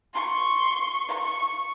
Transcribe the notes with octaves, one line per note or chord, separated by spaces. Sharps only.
C6 C#6
C#6